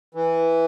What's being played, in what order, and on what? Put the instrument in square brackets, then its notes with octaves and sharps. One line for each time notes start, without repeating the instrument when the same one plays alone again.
[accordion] E3